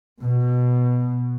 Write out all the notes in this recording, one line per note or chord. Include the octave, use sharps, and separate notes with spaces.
B2